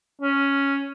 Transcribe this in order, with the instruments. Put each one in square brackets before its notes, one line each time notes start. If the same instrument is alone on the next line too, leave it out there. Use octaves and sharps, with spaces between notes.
[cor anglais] C#4